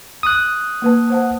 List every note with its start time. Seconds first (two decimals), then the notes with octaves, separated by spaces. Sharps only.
0.23 D#6 F#6
0.82 A#3 B4 A5
1.10 C5 F#5 A5